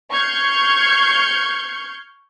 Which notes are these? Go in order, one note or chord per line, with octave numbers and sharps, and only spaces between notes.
C#6 F6 G6 G#6 C7 C#7